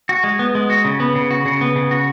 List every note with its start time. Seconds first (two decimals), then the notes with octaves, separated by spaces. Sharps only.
0.09 F#4
0.24 G#3
0.39 B3
0.55 G#3
0.70 F#4
0.85 C#3
1.00 B3
1.15 C#3
1.30 F#4
1.46 C#3
1.61 B3
1.76 C#3
1.91 F#4